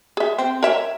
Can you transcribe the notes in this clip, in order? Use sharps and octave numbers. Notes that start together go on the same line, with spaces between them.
G#4 E5
C4
A#4 C#5 E5